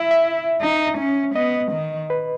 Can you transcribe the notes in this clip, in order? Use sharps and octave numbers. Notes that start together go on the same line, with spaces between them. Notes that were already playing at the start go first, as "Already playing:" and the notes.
Already playing: E4 E5
E5
D#4
C#4
B3 D#5
D#3
B4